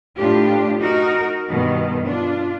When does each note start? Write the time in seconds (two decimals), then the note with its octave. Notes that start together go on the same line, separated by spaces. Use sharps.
0.17 A2 D4 F4 G4
0.80 D#4 F#4 A#4
1.49 G2 B2 D#3
2.06 D4 F4